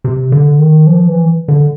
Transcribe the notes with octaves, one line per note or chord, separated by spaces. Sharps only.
C3
D3
D#3
F3
E3
D3